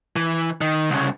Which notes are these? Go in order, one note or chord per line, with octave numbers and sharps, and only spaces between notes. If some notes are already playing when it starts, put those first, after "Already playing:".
E3
D#3
C2 C#3